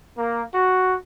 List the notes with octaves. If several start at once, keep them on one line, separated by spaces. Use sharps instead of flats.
A#3
F#4